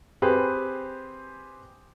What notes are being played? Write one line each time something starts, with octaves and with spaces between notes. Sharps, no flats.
C4 G4 G#4 B4